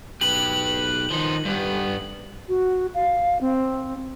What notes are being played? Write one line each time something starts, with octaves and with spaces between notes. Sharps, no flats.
B1 G4 B4 F#7
D#3 F3 D#4
G2 G3 B3
F#4
F5
C4